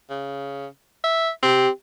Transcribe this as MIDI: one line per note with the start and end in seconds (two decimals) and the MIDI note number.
0.10 0.67 49
1.04 1.30 76
1.43 1.68 60
1.43 1.69 67